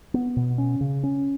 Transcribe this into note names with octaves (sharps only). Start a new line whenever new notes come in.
B3
B2
C#4
C#3
C#4